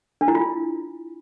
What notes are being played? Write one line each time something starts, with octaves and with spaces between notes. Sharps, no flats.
D4
E4
F4